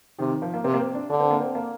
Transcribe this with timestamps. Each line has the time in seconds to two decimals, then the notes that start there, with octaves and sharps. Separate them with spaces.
0.19 C3 D#3
0.42 F3
0.54 A#3
0.64 C3 C4
0.74 A#3
0.80 C4
0.94 D4
1.10 D3 D4
1.20 C4
1.31 A#3
1.40 C4
1.55 A#3